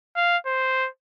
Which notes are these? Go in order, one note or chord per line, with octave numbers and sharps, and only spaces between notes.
F5
C5